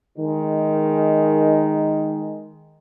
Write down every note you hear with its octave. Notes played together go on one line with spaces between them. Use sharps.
D#3 G#3